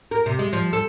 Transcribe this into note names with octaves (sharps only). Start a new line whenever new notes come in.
A#4
C3
G#3
F3
A4